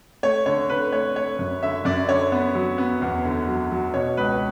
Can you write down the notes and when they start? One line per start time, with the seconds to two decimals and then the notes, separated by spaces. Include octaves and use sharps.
0.23 A3 C#5
0.46 D3 C#5
0.70 D3 B4
0.92 A3 C#5
1.16 A3 C#5
1.39 F#2
1.63 D3 E5
1.85 F#2 D5
2.09 D3 C#5
2.32 B3
2.55 F#3
2.78 B3
3.02 E2
3.24 D3
3.48 F#3
3.72 F#3
3.94 B2 C#5
4.17 C#2 B4